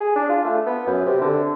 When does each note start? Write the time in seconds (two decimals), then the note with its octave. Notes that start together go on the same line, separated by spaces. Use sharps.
0.01 G#4
0.16 D4
0.29 F4
0.45 A3
0.66 B3
0.86 F#2
1.06 C3
1.21 D3